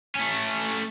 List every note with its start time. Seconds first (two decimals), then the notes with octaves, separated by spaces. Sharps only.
0.15 A3 C#4